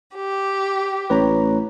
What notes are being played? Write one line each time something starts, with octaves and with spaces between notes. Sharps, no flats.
G4
A1 B4 C#5 A#5